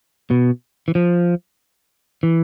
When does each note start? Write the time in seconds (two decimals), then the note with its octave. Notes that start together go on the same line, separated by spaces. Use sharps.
0.30 B2
0.88 E3
0.95 F3
2.23 E3